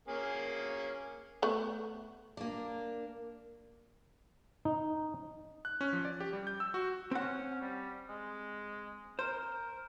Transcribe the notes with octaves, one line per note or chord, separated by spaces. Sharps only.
A#3 C#4 G#4
A3 B3
A#3 D4
D#4
F#6
C#4
F3
D5
G4
G3
G6
E6
F#4
C4 C#4 F#5
G3
G#3
A#4 C5